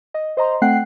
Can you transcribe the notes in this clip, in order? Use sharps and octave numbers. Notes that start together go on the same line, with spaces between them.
D#5
C5 D#5 A#5 C6
A3 C4 F#5 G5 F#6 C7